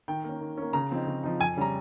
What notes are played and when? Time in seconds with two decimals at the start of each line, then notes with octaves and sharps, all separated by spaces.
0.08 D#3 G5
0.24 A#3 C#4
0.41 D#3
0.57 A#3 C#4
0.73 C#3 A#5
0.90 F3 C4 D#4
1.07 C#3
1.23 F3 C4 D#4
1.39 F2 G#5
1.57 C#3 G3 C#4 A#5